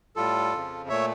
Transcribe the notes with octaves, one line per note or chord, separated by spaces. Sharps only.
A2 G3 F4 A4
F2 C#3 F3
A#2 A3 C#5 E5